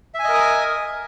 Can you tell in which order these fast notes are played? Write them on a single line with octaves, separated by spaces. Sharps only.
E5 G#5 D#5 A#4 D#6